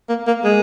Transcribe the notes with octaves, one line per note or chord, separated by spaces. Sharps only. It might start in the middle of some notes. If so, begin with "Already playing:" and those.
A#3
A#3
G#3